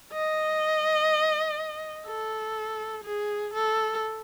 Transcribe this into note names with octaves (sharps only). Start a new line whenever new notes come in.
D#5
A4
G#4
A4